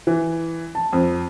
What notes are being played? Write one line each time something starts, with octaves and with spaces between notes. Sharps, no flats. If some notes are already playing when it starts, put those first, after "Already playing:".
E3
A5
F2